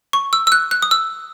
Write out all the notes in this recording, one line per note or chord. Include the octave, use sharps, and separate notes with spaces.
C#6
E6
E6
F#6
F#6
D#6
E6